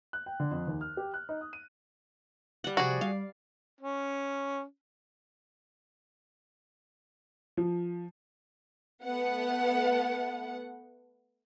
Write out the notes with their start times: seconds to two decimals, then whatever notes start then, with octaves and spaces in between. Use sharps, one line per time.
0.13 F#6
0.26 G5
0.40 D3
0.51 F2
0.67 D#2
0.81 F6
0.97 G4
1.14 F#6
1.29 D#4
1.41 D#6
1.53 D#7
2.64 G3 F#5
2.77 C3 F3 F#4 G#4 D5
3.01 G3 F5
3.81 C#4
7.57 F3
9.04 A3 B3 F#5